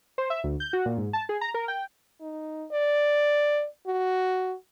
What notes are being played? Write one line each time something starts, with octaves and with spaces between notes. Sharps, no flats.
C5
E5
D2
G6
F#4
A#2
G#2
A5
G#4
A#5
A#4
G5
D#4
D5
F#4